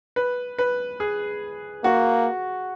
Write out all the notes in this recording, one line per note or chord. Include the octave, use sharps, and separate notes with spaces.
B4
B4
G#4
A#3 F#4